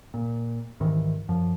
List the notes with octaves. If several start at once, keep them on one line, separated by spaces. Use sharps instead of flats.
A#2
C2 G#2 D#3 E3
F#2 F3